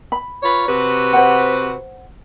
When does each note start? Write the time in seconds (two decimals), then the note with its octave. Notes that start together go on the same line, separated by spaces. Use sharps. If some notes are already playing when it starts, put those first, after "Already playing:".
0.12 B5
0.43 F4 B4 C#5
0.68 C3 F#4 B4
1.13 C5 F#5